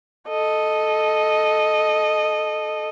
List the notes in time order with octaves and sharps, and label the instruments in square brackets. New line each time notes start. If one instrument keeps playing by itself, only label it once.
[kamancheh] A4 D#5